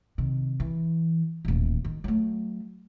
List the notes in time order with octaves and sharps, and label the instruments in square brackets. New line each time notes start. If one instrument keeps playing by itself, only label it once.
[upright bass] C3 D#3
E3
D#1 A1
D#3
F#3 A3